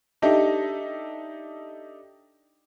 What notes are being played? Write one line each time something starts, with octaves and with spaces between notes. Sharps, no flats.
D4 D#4 G4 A4 D#5 E5